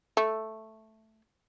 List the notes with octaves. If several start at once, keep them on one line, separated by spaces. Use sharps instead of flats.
A3